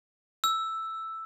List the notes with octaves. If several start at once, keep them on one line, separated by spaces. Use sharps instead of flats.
E6